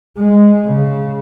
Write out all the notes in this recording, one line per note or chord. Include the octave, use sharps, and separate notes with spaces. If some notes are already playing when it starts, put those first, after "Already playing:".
G#3
C#3